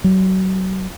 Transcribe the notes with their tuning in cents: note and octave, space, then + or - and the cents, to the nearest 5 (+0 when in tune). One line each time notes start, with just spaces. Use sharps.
F#3 +30